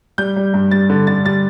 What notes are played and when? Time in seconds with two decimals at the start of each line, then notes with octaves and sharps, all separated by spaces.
0.18 G3 G6
0.37 G3
0.54 G2
0.71 G3 A6
0.90 D3
1.07 D3 A6
1.25 G3 A6